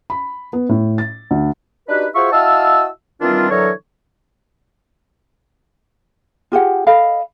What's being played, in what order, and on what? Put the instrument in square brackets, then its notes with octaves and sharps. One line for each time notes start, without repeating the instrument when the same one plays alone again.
[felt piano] B5
B3
A2
A6
D2
[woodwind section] D4 D#4 F#4 G4 B4
F4 F#4 G#4 C5 E5 C#6
E4 F#4 D#5 F5 A5 E6
D#3 E3 G3 C4 D4 F4
D3 E3 F#3 A4 A#4 C#5
[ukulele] F4 G4 G#4 F#5
A4 D#5 F5 B5